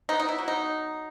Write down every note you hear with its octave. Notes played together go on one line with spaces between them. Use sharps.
B3 D#4
D#4
E4
F#3
D#4